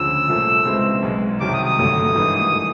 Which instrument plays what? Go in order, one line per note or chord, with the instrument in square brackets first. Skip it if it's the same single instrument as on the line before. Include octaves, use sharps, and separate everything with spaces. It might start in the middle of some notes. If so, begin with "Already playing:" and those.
Already playing: [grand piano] D2 C#3 F3 [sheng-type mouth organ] E6
[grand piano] C2 A#2 F3 A3
C#2 B2 G#3 C4 E4
B1 B2 G#3
[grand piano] C2 C3 D#3 F#3 [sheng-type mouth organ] D6
[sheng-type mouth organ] D#6
D#6
[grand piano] G1 G2 D3 F#3 A3
G#1 G2 E3
E3 A3